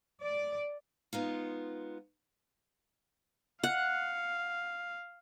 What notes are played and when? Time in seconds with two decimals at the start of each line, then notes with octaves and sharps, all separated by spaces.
0.24 D5
1.13 G#3 B3 D#4 F4
3.63 F5 F#5